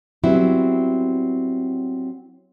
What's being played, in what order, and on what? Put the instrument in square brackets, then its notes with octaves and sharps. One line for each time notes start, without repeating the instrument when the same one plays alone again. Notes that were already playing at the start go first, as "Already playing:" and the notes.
[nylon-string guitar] F#3 G3 B3 C4 E4